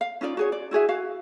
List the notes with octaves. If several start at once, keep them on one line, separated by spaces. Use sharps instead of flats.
F5
C#4 D#4 F4 D5
F#4 G#4 C#5
D5
E4 F#4 G#4 E5
F#4 F5